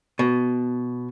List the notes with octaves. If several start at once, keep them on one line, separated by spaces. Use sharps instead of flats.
B2